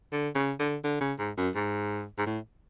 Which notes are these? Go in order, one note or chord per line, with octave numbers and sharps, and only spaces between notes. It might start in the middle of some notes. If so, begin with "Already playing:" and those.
D3
C#3
D3
D3
C#3
G#2
F#2
G#2
G#2
A2